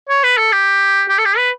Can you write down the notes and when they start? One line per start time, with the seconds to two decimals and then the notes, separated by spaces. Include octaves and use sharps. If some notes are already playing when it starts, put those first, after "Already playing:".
0.09 C#5
0.24 B4
0.38 A4
0.52 G4
1.09 G4
1.18 A4
1.25 G4
1.37 B4